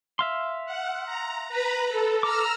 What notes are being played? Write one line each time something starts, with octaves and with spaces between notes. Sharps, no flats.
E5 F5 C6
F#5
A#5
B4 A#5 B5
A4
A#5 D6 E6 F6